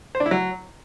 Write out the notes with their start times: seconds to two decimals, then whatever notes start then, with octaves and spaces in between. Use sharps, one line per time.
0.15 C5
0.20 D4
0.26 E4
0.31 F#3